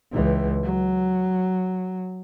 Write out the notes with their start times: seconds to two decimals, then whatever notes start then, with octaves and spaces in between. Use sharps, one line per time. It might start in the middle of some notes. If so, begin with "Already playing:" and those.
0.12 C#2 E3
0.63 F#3